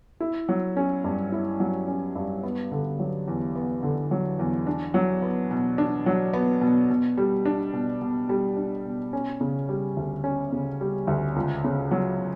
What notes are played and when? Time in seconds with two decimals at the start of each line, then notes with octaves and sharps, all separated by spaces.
0.20 E4
0.49 F#3
0.77 C#4
1.04 G2
1.32 E4
1.60 F#3
1.88 C#4
2.15 G2
2.43 B3
2.71 D3
2.99 F#3
3.28 E2
3.56 B3
3.83 D3
4.11 F#3
4.39 E2
4.67 D4
4.94 F#3
5.22 B3
5.51 B2
5.78 D4
6.06 F#3
6.33 B3
6.61 B2
6.90 B2
7.17 G3
7.45 D4
7.74 B2
8.02 B2
8.29 G3
8.56 D4
8.85 B2
9.13 C#4
9.41 C#3
9.69 G3
9.97 D2
10.24 C#4
10.52 C#3
10.81 G3
11.07 D2
11.36 C#2
11.64 C#3
11.91 F#3